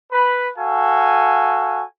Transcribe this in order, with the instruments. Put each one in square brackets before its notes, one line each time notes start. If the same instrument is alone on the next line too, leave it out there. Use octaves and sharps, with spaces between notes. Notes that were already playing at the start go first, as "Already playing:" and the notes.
[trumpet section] B4 B5
F#4 A4 F5 G#5